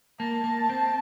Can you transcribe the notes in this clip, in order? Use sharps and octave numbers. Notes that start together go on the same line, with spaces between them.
A#3 A5
A#3
C4